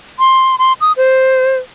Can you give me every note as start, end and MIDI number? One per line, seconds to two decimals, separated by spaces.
0.19 0.56 84
0.59 0.73 84
0.81 0.92 87
0.97 1.58 72